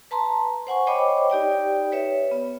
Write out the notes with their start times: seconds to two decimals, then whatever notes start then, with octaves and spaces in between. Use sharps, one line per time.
0.11 B4 A5 A#5 C6
0.67 C5 F#5 G#5 C#6
0.87 C5 C#5 D#5 G5 B5 D6
1.30 D#4 G4 D5 G5
1.92 B4 C#5 E5
2.31 B3